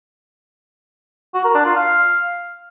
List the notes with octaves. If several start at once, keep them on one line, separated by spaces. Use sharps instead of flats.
F#4
A#4
D4
F4
F5